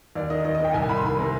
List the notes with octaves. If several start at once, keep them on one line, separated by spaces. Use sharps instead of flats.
D#2 D5
D#3 D#5
D#2 D#5
D#3 D#5
G5
C2 G#5
C2 B5
C6
D#3 B5
C3